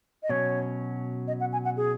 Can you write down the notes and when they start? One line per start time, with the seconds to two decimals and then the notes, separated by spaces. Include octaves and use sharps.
0.23 D#5
0.29 B2 F#3 C#4 C#5
1.28 D#5
1.40 F#5
1.53 G#5
1.65 F#5
1.77 G#4